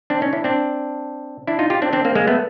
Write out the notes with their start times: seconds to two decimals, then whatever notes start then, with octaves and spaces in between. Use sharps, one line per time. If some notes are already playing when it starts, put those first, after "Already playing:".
0.10 C4 D4
0.21 C#4 D#4
0.33 D4 E4
0.44 C4 D4
1.47 D4 E4
1.59 D#4 F4
1.70 F4 G4
1.82 C4 D4
1.93 C4 D4
2.05 A#3 C4
2.15 G#3 A#3
2.27 A3 B3